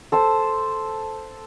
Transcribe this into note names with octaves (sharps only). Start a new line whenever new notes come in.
A4 C5 A5